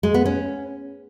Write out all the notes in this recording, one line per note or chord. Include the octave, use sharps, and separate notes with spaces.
G#3
B3
C#4